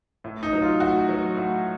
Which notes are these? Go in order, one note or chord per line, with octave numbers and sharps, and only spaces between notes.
A2
D#4
F#3
F4
A2 F#4
F#3
A2